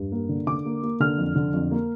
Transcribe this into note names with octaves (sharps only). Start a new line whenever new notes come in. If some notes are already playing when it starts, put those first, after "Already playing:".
Already playing: G2
A#3
D3
D3 D6
A#3
A#3
D3 F6
F2
D3
F2
A#3